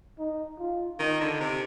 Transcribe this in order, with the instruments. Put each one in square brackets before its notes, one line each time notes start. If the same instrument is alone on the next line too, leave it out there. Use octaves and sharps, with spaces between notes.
[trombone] D#4
F4
[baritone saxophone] D#3 [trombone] D#4
[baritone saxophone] D3
C3